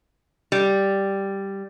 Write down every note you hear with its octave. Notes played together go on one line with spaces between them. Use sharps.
G3